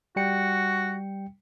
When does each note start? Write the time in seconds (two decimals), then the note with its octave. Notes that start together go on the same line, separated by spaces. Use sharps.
0.16 G3 F#4 G5 C#7